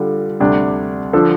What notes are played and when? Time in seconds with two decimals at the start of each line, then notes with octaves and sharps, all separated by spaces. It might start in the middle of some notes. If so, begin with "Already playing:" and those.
Already playing: D3 G3 F4
0.40 D2 C3 G3 D4
1.13 D3 F3 D4 A4